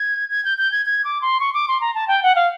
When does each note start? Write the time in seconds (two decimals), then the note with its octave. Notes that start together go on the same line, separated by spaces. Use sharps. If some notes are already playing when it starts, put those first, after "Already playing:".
Already playing: G#6
0.31 G#6
0.45 G6
0.58 G6
0.72 G#6
0.86 G#6
1.04 D6
1.22 C6
1.40 C#6
1.54 D6
1.68 C6
1.81 A#5
1.95 A5
2.08 G5
2.23 F#5
2.35 F5